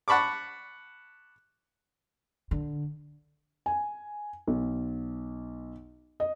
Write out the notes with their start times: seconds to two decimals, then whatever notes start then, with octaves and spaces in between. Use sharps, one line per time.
0.08 F#5 A5 B5 C#6 D6
2.51 D3
3.66 G#5
4.48 B1
6.20 D#5